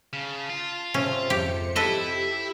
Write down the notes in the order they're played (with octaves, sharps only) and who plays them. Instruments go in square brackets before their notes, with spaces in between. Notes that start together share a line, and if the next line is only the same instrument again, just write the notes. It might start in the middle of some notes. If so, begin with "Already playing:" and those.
[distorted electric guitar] C#3 [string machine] A5
[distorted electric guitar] F4
[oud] G#2 C3 [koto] C#4
[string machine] F2 C5 C#7 [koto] G4
[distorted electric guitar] E4 [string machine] G4 E6 [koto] A4 B4 D#5